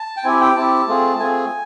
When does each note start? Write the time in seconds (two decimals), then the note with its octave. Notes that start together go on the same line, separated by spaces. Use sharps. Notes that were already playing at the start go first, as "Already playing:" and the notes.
Already playing: A5
0.17 G5
0.24 C4 E4 G4 G#5
0.40 G5
0.56 C4 E4 G4 A5
0.87 A3 C4 F4 G#4
1.19 A3 C4 F4 G#4 G#5